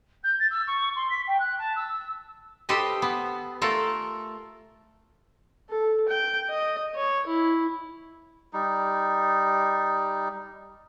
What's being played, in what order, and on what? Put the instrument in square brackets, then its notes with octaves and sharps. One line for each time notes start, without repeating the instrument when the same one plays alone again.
[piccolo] G6
A6
E6
C#6
C6
B6
G5
F#6
A5
E6
[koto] G4 A4 B4 C5 D#5
B3
A3 F4 A4 A#4
[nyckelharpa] A4
G5
D#5
C#5
E4
[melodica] G3 D#4